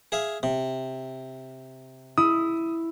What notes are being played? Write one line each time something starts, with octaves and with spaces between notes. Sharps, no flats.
G#4 E5 F5
C3
E4 D#6